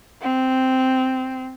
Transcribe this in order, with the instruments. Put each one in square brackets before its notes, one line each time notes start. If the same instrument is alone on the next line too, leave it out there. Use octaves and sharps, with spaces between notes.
[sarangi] C4